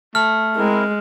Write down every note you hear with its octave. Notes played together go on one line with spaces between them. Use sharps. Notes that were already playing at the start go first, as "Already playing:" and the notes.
A3 F6
G#3 C4 E4 A#4